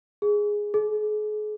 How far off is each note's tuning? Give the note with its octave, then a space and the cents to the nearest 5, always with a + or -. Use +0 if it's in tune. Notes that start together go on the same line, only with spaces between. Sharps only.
G#4 +0
G#4 +40